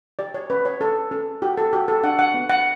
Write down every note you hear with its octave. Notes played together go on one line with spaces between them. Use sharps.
G4 D5
C#5
C#4 B4
C#5
C#4 A4
C#4 A4
F#4 G4
A4
F#4 G4
A4
D4 F#5
F#5
B3
F#5